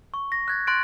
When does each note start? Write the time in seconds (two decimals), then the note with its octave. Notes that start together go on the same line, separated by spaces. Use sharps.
0.14 C#6
0.32 A#6
0.48 F#6 G#6 A6
0.67 C6 F#6 A6 D7